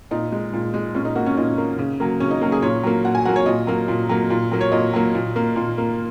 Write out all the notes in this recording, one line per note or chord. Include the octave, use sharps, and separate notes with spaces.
A#2 D#4
G#3
A#2
G#3
A#2 C#4
D#4
A#3 F#4
C#4
A#2 D#4
A#3
C#3
F#3 A#3
C#3 C#4
D#4
F#3 A#3
G#4
A#2 C#5
F#3 A#3
A#2 F#5
G#5
F#3 A#3 F#5
C#5
A#2 D#5
F#3 A#3
A#2
F#3 A#3
A#2
F#3 A#3
C#5
A#2 D#5
F#3 A#3
A#2
A#3
A#2
A#3